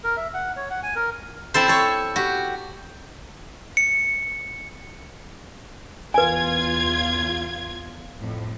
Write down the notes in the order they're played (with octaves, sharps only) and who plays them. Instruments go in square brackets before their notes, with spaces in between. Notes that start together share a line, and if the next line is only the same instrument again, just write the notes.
[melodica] A#4
E5
F#5
C#5
F#5
G#5
A#4
[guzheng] C4 E4 A4 C5
A4 C#5
F#4 G4
[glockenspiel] C#7
[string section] E2 F4 G#6 [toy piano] B4 G#5
[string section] F2 A2